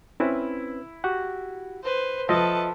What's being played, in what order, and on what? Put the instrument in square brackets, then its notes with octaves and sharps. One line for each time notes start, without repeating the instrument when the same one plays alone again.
[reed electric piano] C4 C#4 B4 [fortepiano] E4
[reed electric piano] F#4 G4 F#5
[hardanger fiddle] B4 C5
[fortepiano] F3 [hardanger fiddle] A4 B4 [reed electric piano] D#5 E5